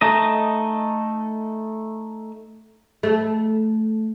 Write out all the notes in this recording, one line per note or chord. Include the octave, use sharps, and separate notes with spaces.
A3 D#4 D#5
A3